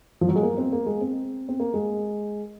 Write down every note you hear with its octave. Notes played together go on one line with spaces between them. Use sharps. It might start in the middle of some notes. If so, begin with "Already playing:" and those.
F3
F#3
G#3
A#3
C4
A#3
G#3
C4
C4
A#3
G#3